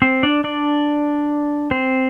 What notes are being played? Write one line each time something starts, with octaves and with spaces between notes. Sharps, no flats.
C4 C5
D4 D5
D4 D5
C4 C5